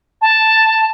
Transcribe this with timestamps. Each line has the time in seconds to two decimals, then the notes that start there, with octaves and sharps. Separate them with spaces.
0.21 A5